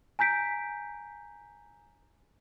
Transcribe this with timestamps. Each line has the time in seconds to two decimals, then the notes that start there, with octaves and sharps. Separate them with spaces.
0.19 G#5 A#5 G6 B6 D7